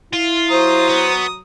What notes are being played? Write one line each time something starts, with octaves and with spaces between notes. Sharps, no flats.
E4 F4
F#3 C5 A#5 D#6
B3